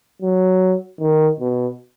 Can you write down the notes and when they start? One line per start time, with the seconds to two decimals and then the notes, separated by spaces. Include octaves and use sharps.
0.22 F#3
1.00 D#3
1.40 B2